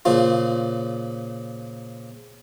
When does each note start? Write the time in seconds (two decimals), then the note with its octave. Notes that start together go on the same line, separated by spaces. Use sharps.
0.05 A#2 C#3 F3 F4